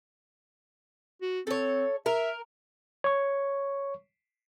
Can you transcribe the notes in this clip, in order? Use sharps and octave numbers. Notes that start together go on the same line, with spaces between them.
F#4
C4 A4 C#5
A#4 E5
C#5 C#6